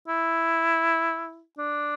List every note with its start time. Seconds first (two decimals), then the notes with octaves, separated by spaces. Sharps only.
0.08 E4
1.58 D4